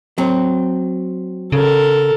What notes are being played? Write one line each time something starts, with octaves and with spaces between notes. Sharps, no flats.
F#3 C4
C#3 A4 A#4